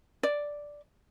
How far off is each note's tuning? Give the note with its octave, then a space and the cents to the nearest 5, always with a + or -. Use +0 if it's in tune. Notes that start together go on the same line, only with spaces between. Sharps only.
D5 +0